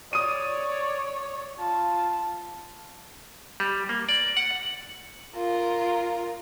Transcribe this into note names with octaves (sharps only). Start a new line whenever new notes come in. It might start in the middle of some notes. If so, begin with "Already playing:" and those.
C#5 D5 D#6 D#7
F4 A5
G3
A#3
D5
F#5
F4 A#4